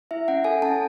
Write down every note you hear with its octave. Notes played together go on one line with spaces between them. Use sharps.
E4 E5
C#4 F#5
A4 G#5
C#4 A5